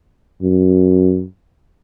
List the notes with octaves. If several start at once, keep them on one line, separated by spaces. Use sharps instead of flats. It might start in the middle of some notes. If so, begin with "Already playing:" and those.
F#2